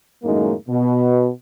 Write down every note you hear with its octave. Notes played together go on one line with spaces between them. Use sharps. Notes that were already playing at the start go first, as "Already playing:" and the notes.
F#2 A2 D#3 G#3 A#3 D#4
B2